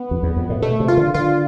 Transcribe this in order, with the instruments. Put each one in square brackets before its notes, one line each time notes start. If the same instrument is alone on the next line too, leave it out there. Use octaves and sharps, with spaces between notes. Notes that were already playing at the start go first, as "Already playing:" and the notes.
Already playing: [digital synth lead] B3
[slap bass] F2
E2
F2
A2
[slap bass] B2 [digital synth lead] A3
[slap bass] C3
[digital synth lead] F4
[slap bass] D3
[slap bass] D3 [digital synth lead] F4